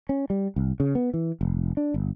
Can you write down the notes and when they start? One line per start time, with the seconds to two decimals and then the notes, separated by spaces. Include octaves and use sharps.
0.09 C#4
0.30 G3
0.56 C2
0.80 C#3
0.95 B3
1.14 E3
1.41 F1
1.77 D4
1.94 G1